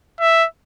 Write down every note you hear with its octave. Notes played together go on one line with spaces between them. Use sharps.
E5